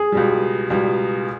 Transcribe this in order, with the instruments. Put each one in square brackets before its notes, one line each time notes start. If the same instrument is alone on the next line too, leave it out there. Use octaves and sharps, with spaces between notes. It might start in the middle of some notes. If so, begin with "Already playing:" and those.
Already playing: [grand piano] G#4
[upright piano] C#2 B2 G3
C#2 B2 G3